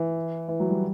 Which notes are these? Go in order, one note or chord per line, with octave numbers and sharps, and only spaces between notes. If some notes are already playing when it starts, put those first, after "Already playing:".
Already playing: E3
E3
F#3
G3